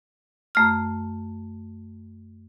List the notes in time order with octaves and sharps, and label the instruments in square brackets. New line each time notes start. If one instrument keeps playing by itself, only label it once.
[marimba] F#2 A3 F6